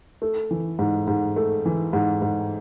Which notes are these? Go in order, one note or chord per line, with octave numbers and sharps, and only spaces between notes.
A3
E3
G#2
G#2
A3
E3
G#2
G#2